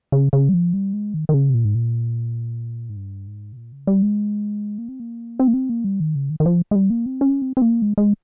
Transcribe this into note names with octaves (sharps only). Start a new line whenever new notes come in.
C#3
C#3
G3
F3
G3
G#3
D#3
D#3
C#3
C3
A#2
G#2
A#2
G#2
G2
G#2
C3
A#2
C#3
G3
G#3
A#3
C4
A#3
C4
A#3
C4
A#3
G3
D#3
C#3
D#3
D#3
F3
G#3
G3
A#3
C4
C#4
C4
C4
A#3
G#3
G#3